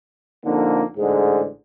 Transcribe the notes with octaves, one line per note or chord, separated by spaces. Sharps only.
F2 D3 A#3 D#4
A1 G#2 D3 G#4